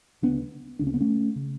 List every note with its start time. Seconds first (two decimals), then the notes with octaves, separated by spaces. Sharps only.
0.22 D2 C#3 B3 D4
0.79 D2 C#3 D4
0.87 C#4
0.94 B3
1.01 A3 C#4
1.36 C#3